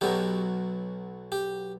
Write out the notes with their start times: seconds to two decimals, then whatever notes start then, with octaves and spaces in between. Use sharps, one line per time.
0.01 B1 B2 F#3 G4
1.32 G4